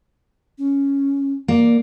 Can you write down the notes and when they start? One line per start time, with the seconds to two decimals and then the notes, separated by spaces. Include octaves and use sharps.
0.58 C#4
1.48 A#3 D5